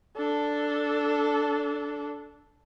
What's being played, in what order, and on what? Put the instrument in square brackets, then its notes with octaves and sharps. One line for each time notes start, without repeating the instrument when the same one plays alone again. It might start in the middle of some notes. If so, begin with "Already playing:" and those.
[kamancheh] D4 A4